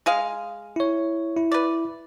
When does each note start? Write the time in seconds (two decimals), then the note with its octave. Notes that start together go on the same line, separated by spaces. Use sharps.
0.06 G#3 G#4 F5
0.76 E4 C#5
1.37 E4
1.52 B4 D5